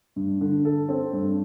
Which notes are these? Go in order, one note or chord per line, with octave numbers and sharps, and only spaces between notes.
G2
D3
A4
C4
G2